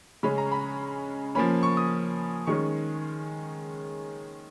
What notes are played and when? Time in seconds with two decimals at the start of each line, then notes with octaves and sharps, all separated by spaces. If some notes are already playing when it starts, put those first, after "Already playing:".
0.23 C#3 G#3 C#4 B5
0.38 A#5
0.52 B5
1.35 F3 A#3 C#4 B5
1.63 C#6
1.77 D#6
2.47 D#3 G#3 C#4 C#6